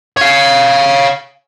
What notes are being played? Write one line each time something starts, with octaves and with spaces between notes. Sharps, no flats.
C#5 F5